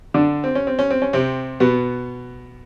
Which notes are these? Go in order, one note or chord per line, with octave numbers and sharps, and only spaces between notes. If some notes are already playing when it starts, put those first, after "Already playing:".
D3 D4
C4
C#4
C4
C#4
C4
C#4
C3 C4
B2 B3